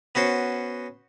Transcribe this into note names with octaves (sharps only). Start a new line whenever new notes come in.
B3 C#4 F#4 C5